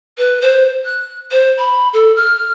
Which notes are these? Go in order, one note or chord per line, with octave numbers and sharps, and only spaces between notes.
B4
C5
F#6
C5
B5
A4
F6